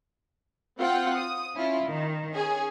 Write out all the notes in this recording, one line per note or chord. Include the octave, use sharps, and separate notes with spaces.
C4 F4 F#5 G5
D#6
C#4 E4 F4
D#3
C#4 G#4